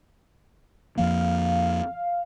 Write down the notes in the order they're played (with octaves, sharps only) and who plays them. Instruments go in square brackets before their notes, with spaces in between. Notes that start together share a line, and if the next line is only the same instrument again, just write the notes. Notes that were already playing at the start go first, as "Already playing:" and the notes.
[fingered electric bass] F2 F3 A#3 [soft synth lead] F5